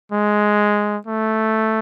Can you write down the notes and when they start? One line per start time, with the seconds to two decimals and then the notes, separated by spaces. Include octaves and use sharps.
0.12 G#3
1.07 A3